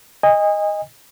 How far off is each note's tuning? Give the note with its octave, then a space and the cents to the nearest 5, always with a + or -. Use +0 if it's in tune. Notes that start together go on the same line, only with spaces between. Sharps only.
D#5 +0 G#5 -35